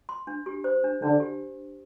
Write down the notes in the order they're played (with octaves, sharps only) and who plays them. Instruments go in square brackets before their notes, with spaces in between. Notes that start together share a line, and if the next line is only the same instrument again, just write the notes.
[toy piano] C6
D4
G4
C5
D4
[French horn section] D3 [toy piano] D4
[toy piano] G4